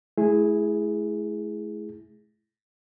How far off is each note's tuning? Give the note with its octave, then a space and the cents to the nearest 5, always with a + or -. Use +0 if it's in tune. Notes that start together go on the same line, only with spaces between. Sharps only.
A3 -45 E4 +0 G#4 +0